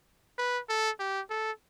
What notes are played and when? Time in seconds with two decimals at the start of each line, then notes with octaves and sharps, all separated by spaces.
0.38 B4
0.69 A4
0.99 G4
1.30 A4